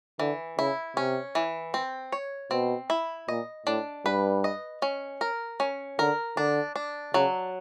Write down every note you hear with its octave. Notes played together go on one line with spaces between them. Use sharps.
D3 E3
C#3 E4
C3 C#4
E3
C4
C#5
B2 C4
E4
A#2 D#5
A2 D4
G2 B4
D#5
C#4
A#4
C#4
D3 A#4
D3 D4
D4
C#3 F#3